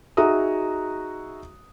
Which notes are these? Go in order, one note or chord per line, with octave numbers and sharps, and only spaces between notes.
D#4 F#4 G#4 E5 A#5 D#6